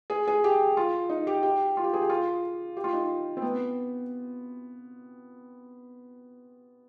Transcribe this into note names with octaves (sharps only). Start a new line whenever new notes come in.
G#4
G#4
G4
F4
D#4
G4
G4
F4
G4
G#4
G4
F4
G4
F4
D#4
C4
B3